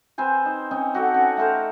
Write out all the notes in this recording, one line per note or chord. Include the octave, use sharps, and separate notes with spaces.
C4 B4 C5 G#5
D#4
C4 C#4 D#4
F#4 G4 A4 F#5
C#4
A3 A4 A#4 C5